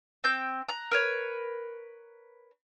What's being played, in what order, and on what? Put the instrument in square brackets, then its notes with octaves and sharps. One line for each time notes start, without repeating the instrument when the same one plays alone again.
[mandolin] C4 G5 G6
A#5 F#6
A#4 B4 C#5